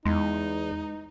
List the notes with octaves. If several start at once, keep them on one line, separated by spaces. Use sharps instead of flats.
E2 G#3 D#4